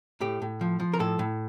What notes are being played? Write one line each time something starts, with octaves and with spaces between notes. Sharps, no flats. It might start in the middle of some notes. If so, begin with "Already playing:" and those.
A2 G4
A2
F3
F3
A#4
A2 A4
A2